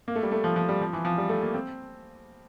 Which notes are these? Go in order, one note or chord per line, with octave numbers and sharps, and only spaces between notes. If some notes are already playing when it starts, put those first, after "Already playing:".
A#3
A3
G3
A3
F3
F3
G3
F3
E3
F3
G3
A3
A#3
C4